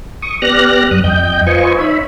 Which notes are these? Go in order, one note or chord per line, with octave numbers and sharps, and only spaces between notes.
C#6 D#6
B3 G4 D5 F6 F#6 A#6
F#2 D#6 F#6
F2 D#5 G5 G6
F4 B4 C5 D#5 G#5 C#6
D#4 C#5 E5 B5